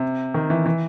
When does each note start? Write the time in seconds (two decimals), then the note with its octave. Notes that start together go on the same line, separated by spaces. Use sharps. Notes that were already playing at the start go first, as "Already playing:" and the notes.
Already playing: C3
0.34 D#3
0.50 E3
0.66 E3